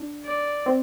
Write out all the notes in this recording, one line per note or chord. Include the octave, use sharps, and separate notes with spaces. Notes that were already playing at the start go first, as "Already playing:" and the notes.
Already playing: D4
D5
C4